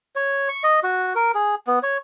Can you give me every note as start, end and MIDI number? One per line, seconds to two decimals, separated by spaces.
0.16 0.48 73
0.48 0.63 85
0.64 0.80 75
0.83 1.13 66
1.15 1.32 70
1.35 1.55 68
1.67 1.79 59
1.83 1.97 73